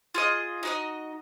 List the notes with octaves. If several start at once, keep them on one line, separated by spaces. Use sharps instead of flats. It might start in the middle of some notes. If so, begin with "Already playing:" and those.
F4 G#4 D#5
D#4 F#4 B4 D#5